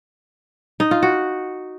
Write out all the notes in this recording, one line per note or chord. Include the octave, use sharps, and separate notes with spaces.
D#4
F4
F#4